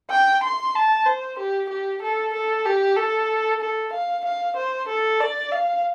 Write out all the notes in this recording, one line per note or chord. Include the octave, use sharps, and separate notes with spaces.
G5
C6
A5
C5
G4
G4
A4
A4
G4
A4
A4
F5
F5
C5
A4
D5
F5